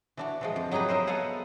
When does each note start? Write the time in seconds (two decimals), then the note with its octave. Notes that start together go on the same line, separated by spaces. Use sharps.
0.17 E3 D4 F#4
0.41 E3 F3 G#3
0.56 F2
0.71 F#3 D#4 G4 G#4 B4
0.88 A#4 C5 D#5 E5
1.07 B3 A4 F5 F#5 G#5